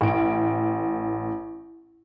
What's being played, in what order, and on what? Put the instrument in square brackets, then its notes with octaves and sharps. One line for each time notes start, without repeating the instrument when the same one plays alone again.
[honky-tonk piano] A1 D7